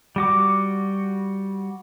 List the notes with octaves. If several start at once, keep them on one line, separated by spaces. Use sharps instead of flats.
G3 F#4 D6